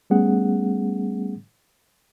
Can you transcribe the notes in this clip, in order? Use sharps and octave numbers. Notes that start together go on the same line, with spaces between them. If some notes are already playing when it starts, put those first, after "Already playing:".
G3 A3 B3 C#4 G#4 F#5